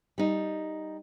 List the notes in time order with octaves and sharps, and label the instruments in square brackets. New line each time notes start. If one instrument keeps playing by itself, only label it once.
[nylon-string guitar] G3 D#4